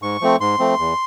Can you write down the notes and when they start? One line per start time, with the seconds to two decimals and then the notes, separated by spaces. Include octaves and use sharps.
0.02 G#2 C#6
0.21 F3 A3 C4
0.40 G#2 C6
0.59 F3 A3 C4
0.78 E2